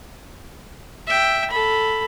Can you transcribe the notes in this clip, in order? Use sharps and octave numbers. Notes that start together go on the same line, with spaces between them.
E5 G5
A4 B5